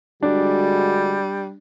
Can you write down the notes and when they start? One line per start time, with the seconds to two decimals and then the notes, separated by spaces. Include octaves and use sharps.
0.23 D3 G3 G#3 D4 F#4